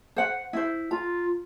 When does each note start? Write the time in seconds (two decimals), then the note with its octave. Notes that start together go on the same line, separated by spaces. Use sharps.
0.16 C5 F#5
0.53 E4 C5
0.91 F4 A#5